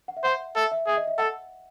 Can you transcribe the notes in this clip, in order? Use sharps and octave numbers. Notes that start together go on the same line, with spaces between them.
F#5
E5
C5 F#5
A4 E5
E5
G#4 E5
D#5
E5
A4 F#5